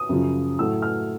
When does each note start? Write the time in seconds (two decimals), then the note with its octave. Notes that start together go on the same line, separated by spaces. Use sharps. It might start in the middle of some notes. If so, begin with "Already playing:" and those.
Already playing: D#6
0.09 F#2 C#3 F3
0.59 A2 F#3 A3 E6
0.82 F6